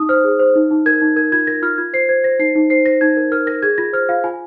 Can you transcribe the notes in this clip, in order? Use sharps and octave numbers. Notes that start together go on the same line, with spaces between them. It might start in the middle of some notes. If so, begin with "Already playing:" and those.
Already playing: D#4 D#6
C5 F6
G#4
C5
D#4
D#4
A#4 G#6
D#4
A#4 G#6
F4 G#6
A#4 A#6
F4 F6
F4 G#6
C5 C7
C5 G#6
C5 A#6
D#4 C7
D#4
C5 C7
C5 A#6
D#4 G#6
A#4
A#4 F6
A#4 A#6
G#4 G#6
F4 A#6
C5 F6
F4 F5
F4 G#5